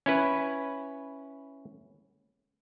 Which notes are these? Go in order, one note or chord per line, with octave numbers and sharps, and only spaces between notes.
C#4 E4 B4